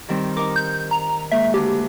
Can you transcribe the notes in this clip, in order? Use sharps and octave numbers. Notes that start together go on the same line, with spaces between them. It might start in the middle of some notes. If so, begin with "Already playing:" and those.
D#3 G3 C4
D#4 A#4 D6
G6
A#5
G#3 A#3 E5
D2 G4